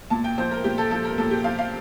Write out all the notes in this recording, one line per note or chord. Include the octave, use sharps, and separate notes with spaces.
A#2 A5
G5
F3 C5
A#4
A#2 G4
A4
F3 A4
A#4
A#2 A4
G4
F3 F5
F5